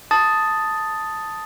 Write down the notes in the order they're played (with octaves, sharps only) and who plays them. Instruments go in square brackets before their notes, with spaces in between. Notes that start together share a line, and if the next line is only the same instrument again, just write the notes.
[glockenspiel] A5 D#6 A6